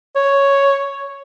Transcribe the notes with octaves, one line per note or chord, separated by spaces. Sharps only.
C#5